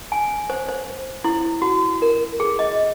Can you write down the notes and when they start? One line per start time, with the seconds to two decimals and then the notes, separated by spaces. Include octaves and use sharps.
0.12 G#5
0.50 C5
0.68 C5
1.24 E4
1.62 F#4
2.02 A#4
2.40 G#4
2.59 D#5